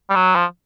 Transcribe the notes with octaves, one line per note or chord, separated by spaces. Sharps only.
G3
F#3
F3